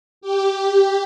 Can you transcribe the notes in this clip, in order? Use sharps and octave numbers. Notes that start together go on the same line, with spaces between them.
G4